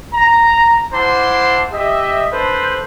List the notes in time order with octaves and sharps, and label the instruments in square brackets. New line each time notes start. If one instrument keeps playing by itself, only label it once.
[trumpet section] A#5
E4 C5 F#5 A5 C6 D6
G4 D#5 E5
D4 A4 B4 C5